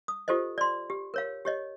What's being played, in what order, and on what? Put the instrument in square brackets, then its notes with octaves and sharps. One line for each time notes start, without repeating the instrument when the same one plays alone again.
[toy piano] D#6
F4 G4 A4 C5 D#5
D5 C6
G4
A#4 C#5 F5
G4 C#5 D#5